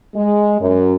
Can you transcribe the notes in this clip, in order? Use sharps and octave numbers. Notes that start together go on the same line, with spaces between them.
G#3
F#2